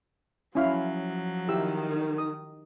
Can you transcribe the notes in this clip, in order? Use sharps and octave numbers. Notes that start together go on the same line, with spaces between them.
F3 F#3 C#4 E4 F5
D#3 E4 G4 E6
D#6